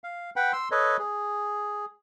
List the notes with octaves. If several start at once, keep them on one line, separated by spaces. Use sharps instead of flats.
F5
B4 F#5 G5 B5
C6 E6
A4 B4 C#5 D#5
G#4